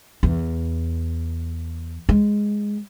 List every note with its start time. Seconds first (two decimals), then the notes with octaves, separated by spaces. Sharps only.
0.23 E2
2.09 G#3